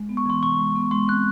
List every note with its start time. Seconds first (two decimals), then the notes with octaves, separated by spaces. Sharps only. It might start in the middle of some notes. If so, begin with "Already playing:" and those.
Already playing: G#3
0.09 B3
0.17 C#6
0.26 E3 C6
0.42 C3 C#6
0.59 G#3
0.75 B3
0.91 G#3 C6
1.08 C4 F#6